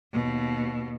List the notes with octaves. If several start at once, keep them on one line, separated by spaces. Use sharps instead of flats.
D#2 B2